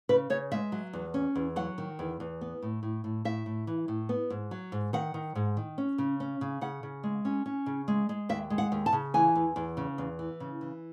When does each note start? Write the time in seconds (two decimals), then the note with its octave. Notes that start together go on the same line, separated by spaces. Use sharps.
0.09 C#3 B4
0.30 C#3 C#5
0.52 G#3 E5
0.72 F#3
0.93 E2
1.14 C#4
1.35 E2
1.56 F#3 F#5
1.78 D#3
1.99 E2
2.20 E2
2.41 B3
2.62 A2
2.83 A2
3.04 A2
3.25 A2 E5
3.46 A2
3.67 E3
3.88 A2
4.09 B3
4.30 G#2
4.51 F#3
4.72 G#2
4.93 D#3 F#5
5.14 D#3
5.35 G#2
5.57 D#3
5.78 C#4
5.98 C#3
6.20 C#4
6.41 C#3
6.61 C#3 F#5
6.83 C#3
7.04 G#3
7.25 C#4
7.46 C#4
7.66 C#3
7.88 G#3
8.09 G#3
8.29 D#2 E5
8.50 G#3
8.58 F#5
8.72 D#2
8.86 A5
8.93 C#3
9.14 E3 G#5
9.35 E2
9.56 E2
9.77 C#3
9.98 E2
10.19 E3
10.40 C#3
10.61 E3